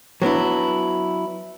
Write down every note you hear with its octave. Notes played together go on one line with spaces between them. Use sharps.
F#3 B3 D4 E4